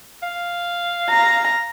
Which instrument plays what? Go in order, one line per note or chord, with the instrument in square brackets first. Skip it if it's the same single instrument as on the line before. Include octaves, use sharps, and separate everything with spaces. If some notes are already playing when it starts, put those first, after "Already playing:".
[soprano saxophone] F5
[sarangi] A#5